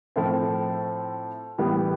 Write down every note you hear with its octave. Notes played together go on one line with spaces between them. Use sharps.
A2 F3 A3 C4
A2 E3 G3 B3